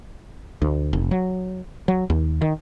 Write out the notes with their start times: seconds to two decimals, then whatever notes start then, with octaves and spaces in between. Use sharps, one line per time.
0.62 D2
0.93 F1
1.11 F#3
1.88 F#3
2.10 D#2
2.42 D#3